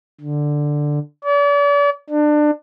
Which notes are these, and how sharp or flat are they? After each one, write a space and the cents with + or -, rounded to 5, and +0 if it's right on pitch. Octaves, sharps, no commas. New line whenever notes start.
D3 +5
D5 -40
D4 +25